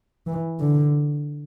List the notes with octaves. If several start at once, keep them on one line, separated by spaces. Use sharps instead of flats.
E3
D3